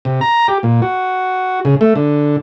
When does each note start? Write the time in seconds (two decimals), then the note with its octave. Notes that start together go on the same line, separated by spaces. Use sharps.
0.05 C3
0.21 A#5
0.48 G4
0.63 A#2
0.82 F#4
1.65 C#3
1.81 A3
1.96 D3